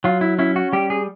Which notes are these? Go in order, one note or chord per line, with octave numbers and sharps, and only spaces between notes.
F#3 F4
E4
C#4 E4
F#4
G3 G4
G#4